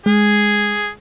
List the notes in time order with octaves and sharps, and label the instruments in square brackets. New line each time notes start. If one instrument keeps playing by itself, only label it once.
[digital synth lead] G#3 [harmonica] G#4